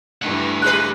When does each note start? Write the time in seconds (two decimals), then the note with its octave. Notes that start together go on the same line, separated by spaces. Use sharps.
0.22 G2 E3 A3 F#5
0.62 A#2 G3 B4 F#6